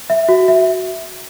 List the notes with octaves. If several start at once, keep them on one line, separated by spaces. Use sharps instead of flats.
E5
F#4
E5